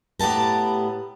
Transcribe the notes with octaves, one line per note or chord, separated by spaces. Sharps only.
A2 B3 G4 A5 A#5